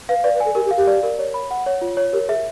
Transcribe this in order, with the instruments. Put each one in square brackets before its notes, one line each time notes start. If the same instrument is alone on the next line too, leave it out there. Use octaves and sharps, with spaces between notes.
[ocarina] B4 [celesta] F5
[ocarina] B4 [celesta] D5
[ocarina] B4
[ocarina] A4 [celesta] G#5
[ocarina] G4 [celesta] A#4
[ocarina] G4
[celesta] F5
[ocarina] G4
[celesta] D5
A#4
C#5
B5
F#5
C#5
F4
C#5
[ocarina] G4 [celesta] A#4
[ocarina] G#4 [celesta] E5